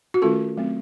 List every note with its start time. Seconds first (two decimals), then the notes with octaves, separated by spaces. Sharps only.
0.14 F#4
0.22 D#3 A3 C#4 F4 A4
0.57 F#3 A3 C4